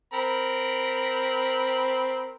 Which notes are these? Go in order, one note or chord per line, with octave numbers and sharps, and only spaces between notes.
C4 A#4 B5